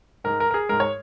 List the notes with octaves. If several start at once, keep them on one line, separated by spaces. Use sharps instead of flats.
G#2 G#3 A#4
A#4
A#4
G#4
G#2 G#3 A#4
C#5